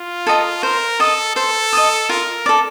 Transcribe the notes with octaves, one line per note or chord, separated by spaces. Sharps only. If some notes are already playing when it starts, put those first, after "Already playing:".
Already playing: F4
A4 D#5 A#5
A#4 C5
A4 D#5 A5 D#6
A4 C5
D#5 A5 D#6
F4 A#4
A4 D5